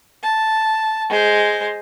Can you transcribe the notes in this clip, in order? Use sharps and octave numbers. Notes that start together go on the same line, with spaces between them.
A5
G#3 C5